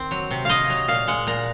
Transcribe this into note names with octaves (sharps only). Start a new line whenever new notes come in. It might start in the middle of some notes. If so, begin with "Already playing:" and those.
Already playing: D#3 C4
F#3
C3
C3 D#5 F5
F#3
A#2 F5
G#3 F#5
A#2 A#5